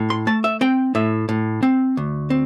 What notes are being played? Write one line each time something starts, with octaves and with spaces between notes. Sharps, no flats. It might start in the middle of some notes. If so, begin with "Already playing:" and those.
Already playing: A2
C6
A3 A5
E5
C4 G5
A2 E5
A2
C4
D2
C4